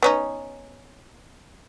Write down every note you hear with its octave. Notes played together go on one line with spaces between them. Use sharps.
B3 C#4 D#4